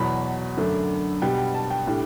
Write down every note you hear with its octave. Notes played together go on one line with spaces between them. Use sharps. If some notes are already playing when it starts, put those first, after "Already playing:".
Already playing: E2 B2 F#3 B5
F#2 D3 A3 D4
B2 G3 B3 G5
G5
A5
G5
A2 G3 D4